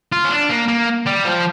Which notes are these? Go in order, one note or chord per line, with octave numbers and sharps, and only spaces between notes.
F4
C#4
D4
A#3
A#3
G3
F3